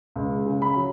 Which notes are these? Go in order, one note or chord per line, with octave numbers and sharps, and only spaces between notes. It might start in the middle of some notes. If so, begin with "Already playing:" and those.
C#2
C#3
B5
F#3